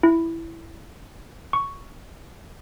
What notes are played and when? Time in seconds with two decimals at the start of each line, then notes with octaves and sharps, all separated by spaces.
0.03 E4
1.53 C#6